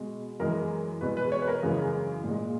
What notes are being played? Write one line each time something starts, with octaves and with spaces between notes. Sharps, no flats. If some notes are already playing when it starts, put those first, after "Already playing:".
Already playing: B2 G#3
F#2 E3 G#3 A#4
E2 B2 G#3 B4
B4
C#5
B4
A#4
F#2 C#3 E3 G#3
A#2
G#3